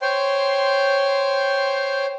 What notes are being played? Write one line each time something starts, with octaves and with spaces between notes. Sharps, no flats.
C5 C#5 G5 C6